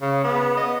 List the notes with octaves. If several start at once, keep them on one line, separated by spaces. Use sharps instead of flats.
C#3
B3
D#5